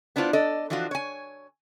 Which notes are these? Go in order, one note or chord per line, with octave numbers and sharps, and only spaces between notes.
B3 D4 E4 F4 C5
A4 D5 D#5
E3 F3 D4 F4 F#4
C#5 G#5